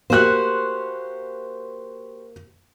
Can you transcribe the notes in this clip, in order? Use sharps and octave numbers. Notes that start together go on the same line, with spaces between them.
A#3 F#4 G4 C5 F#6